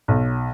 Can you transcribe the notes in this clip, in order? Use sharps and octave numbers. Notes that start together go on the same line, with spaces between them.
B1